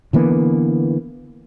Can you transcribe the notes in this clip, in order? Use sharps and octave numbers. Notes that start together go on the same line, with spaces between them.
D3 E3 A#3 B3